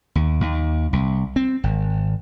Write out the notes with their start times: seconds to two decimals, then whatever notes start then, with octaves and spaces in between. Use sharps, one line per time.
0.15 D#2
0.41 D#2
0.93 C2
1.36 C4
1.64 G#1